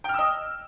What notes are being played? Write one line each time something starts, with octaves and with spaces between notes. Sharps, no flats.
D#5 G5 E6 F6